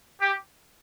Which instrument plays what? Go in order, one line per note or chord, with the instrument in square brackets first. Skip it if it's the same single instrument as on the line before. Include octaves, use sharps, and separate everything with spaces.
[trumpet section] G4